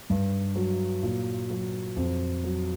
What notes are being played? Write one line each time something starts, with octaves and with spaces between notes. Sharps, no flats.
G2
F#3
A#2
F#3
F2
F#3